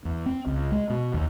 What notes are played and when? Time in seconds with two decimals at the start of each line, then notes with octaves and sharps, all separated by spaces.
0.05 E2
0.26 C4
0.47 C#2
0.72 G#3
0.90 B2
1.14 D#2